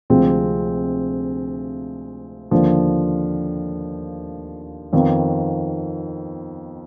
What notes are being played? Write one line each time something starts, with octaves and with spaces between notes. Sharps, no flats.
D2 C3 F3 G#3 C4
D#2 D3 F3
F2 D#3 B3 F4